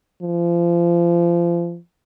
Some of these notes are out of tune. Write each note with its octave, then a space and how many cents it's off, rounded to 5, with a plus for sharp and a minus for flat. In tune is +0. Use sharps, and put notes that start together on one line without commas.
F3 -30